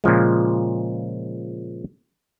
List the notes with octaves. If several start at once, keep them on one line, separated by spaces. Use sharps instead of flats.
A#2 C#3 F3 G#3